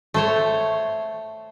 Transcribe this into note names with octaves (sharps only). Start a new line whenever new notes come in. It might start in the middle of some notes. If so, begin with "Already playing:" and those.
A3 C5 C#5